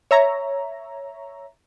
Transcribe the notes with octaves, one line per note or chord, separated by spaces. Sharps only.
C#5 E5 A#5